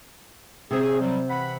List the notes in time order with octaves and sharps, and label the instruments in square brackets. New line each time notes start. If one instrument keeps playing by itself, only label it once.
[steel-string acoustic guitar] C3 C4 [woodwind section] G#4
[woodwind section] F#3 G3
E3 F#5 B5